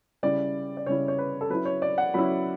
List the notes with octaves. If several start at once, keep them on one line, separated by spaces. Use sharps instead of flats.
C#3 G3 C#4 E4 D5
D5
C#3 G3 C#4 E4 C#5
C#5
B4
A4
F#3 C#4 E4 B4
C#5
D5
F#5
F#3 C#4 E4 B5